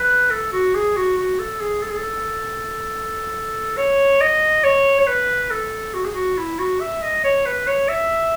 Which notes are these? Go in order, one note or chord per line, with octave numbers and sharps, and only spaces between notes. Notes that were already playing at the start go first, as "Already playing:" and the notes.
Already playing: B4
A4
F#4
G#4
F#4
F#4
A4
G#4
A4
G#4
A4
C#5
D#5
C#5
C#5
B4
A4
F#4
G#4
F#4
E4
F#4
E5
D#5
C#5
B4
C#5
E5